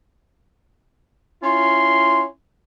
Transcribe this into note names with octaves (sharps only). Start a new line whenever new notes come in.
C#4 E4 F4 C6